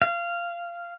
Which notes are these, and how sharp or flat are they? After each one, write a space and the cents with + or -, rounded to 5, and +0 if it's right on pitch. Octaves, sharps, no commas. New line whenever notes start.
F5 -15